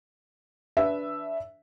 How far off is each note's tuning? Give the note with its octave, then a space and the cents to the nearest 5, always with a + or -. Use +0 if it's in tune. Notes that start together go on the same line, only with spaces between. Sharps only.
D4 -15 B4 +0 E5 +0